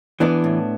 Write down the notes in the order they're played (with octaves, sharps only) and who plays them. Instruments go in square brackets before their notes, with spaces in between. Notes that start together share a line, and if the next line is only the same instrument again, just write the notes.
[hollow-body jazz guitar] E3 B3 D4
A2